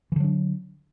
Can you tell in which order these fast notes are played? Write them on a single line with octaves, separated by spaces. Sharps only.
E3 D3 F#3 D4